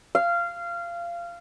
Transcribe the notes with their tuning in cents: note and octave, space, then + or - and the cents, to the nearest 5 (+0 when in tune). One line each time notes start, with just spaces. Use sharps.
F5 -20